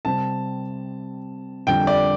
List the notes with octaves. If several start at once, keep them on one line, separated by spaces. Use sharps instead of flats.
C3 G3 C4 A5
F2 D3 G3 G5
D5